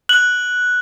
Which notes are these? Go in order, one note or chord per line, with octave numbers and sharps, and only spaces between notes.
F#6 F#7